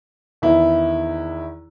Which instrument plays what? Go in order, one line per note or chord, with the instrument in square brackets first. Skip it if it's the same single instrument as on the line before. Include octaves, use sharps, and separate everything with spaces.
[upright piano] E2 D#3 E4 B4